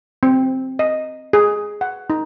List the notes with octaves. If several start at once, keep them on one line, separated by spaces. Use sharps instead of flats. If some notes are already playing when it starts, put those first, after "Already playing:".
C4
D#5
G#4
F#5
D#4